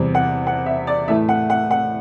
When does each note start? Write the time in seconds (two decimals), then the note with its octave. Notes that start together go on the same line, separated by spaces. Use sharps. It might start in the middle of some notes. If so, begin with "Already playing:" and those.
Already playing: E2 C3 G3
0.15 F#5
0.47 F#5
0.66 E5
0.87 D5
1.08 A2 E3 A3 E5
1.29 F#5
1.50 F#5
1.71 F#5